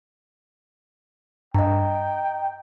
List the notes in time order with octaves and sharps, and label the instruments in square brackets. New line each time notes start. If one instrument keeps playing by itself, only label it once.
[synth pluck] G2 [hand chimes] D#5 A#5 [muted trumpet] G5